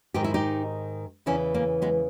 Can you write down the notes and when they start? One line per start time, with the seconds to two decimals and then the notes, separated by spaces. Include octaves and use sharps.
0.14 G#2 D#3 G4
0.24 E4
0.34 D#4 G4
1.26 E2 C#3 E3 C#4 E4
1.54 A#3 C#4
1.82 G#3 B3